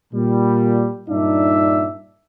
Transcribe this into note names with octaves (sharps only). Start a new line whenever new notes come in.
A#2 G3
G2 A#2 D4 D#4 D5 E5